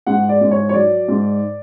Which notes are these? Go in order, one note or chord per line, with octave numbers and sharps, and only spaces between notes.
G#2 F#5
D5
G#2
C#5
C#5
F#3 D5
G#2